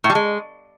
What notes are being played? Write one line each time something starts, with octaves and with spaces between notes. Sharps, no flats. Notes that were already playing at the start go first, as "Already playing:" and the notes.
A2
G3
G#3